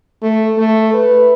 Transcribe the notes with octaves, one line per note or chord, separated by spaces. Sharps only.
A3
A3
B4